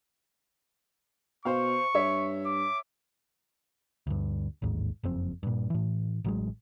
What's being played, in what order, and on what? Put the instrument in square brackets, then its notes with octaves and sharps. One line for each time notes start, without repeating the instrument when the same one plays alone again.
[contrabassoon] B2 [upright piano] C5 F5 [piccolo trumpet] C#6
[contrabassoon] G2 [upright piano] C#5 E5
[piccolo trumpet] D6
[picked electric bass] D2 G2
A1 D#2 G#2
F#1 F2 C4
G2 A#2
A2 E3
A1 F#3 G#3